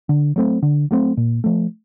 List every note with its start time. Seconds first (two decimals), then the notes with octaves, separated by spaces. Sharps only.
0.09 D3
0.36 F#3 A3 C4
0.63 D3
0.91 F#3 A3 C4
1.17 A#2
1.44 F3 A3